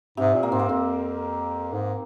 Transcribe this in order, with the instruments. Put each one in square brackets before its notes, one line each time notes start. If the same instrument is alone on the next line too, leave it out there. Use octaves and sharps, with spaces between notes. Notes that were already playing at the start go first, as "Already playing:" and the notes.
[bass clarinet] G#2 [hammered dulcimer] C3
[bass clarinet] A#2
[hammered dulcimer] A#3
[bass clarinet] G#2 [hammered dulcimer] C4
[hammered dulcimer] A#3
[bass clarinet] F2 [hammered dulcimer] C4
[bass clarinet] G#2